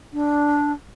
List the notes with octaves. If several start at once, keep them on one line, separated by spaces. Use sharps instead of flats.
D4